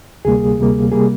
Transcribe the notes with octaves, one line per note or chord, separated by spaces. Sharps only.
D2 C3 G3 A#3 G#4
D2 C3 G3 A#3
C3 G3 A#3 G#4